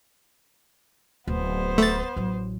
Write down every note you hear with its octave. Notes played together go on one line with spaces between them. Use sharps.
D1 B3 C5
A3 A6
A1 F#3